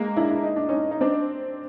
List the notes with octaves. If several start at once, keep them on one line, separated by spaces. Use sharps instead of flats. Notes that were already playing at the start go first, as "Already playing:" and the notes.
Already playing: G#3 A#3
D4 E4
E4
D#4
D4
C#4 D#4
D#4
C4 D4